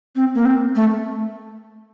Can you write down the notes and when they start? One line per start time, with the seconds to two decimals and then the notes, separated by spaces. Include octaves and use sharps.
0.16 C4
0.35 A#3
0.45 C4
0.76 A3